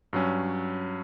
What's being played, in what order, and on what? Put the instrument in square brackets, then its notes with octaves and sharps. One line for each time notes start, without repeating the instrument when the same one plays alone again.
[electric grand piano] G2 F#3 C#4